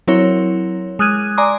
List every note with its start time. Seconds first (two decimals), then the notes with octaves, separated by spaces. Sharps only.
0.07 F#3 C4 E4 A#4 C#5
0.99 G#3 D#6 F6 F#6 G#6 D#7
1.37 D5 G#5 A#5 C6 D6 D#6